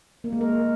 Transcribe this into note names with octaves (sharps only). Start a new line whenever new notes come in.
A#3
G#3
A#4